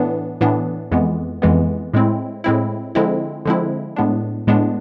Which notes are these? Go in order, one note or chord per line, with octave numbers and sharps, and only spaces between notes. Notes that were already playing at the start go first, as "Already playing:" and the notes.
Already playing: A2 E3 B3 D4
A2 E3 B3 D4
F2 E3 G#3 B3
F2 E3 G#3 B3
A2 G#3 C4 E4
A2 G#3 C4 E4
D3 F3 G#3 C4 E4
D3 F3 G#3 C4 E4
A2 G#3 B3 D4
A2 G#3 B3 D4